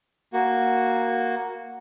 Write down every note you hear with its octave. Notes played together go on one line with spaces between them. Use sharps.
A#3 F#4